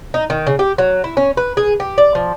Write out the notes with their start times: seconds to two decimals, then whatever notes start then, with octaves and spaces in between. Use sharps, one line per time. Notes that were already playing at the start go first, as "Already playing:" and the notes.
0.14 D#4
0.30 D#3
0.47 C#3
0.59 G4
0.78 F#3
1.04 E4
1.17 C#4
1.37 B4
1.57 G#4
1.80 G4
1.98 D5
2.15 F3